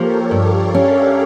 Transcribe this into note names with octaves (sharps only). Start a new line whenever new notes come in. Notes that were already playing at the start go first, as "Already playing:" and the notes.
Already playing: F3 A#3 G4 A4 A#4 C#5
G2 D5 F5
C#4 C#5 E5